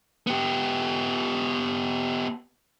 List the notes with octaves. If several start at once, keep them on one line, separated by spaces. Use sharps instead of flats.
B3 G4